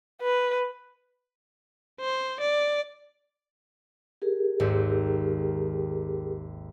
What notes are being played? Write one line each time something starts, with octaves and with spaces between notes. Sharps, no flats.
B4
C5
D5
G4 G#4 A#4
G#1 D#2 G#2